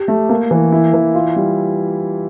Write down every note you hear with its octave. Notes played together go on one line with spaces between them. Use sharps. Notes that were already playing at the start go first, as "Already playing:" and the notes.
Already playing: G4
A3
A#3
E3
E4
E3
F4
G3